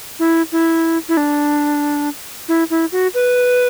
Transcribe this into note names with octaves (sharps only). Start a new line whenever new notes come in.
E4
E4
E4
D4
E4
E4
F#4
B4